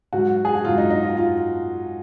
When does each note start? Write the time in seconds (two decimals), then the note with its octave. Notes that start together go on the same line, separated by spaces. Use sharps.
0.13 G#2 F#3 F#4
0.45 G#4
0.55 F#4
0.65 G#2 F#3 F4
0.78 D#4
0.91 D#4
1.03 F4
1.17 F4